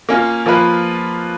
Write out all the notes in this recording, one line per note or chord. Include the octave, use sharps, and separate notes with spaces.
A#3 C#4 F4
F3 A#3 F4 B4